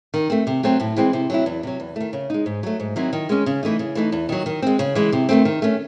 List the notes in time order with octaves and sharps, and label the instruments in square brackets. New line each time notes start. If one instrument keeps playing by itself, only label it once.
[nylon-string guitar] D#3
A3 C4
C3
F#3 A3 C4
A2
E3 G#3 C4
C3
F#3 C4 E4
E2
C3 F#3
E2
D#3 A3
C#3
G#3 D#4
G#2
F#3 A3
G#2
D#3 F#3 C4 E4
D#3
G#3 C#4
C#3
E3 A3 D#4
C#3
E3 A3 D#4
E2
D#3 F#3
D#3
G#3 C4
C#3
E3 G#3
C3
D#3 A3 C4
D#3
A3 C#4